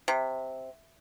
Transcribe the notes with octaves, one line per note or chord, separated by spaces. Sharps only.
C3